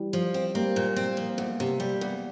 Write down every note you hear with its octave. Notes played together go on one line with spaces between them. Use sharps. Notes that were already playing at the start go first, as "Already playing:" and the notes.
Already playing: E3 G3
F3
C4
G3 A#3 C4
A#2
C4
F3
E2
C3
G3
E2